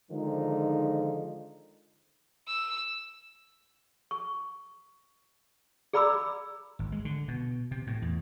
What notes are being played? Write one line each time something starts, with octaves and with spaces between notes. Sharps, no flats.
D3 D#3 F3 G#3 D#4
E6
C#6
G#4 D5 A#5 B5 D6 E6
G#1
G#3
D3
B2
C3
A2
E2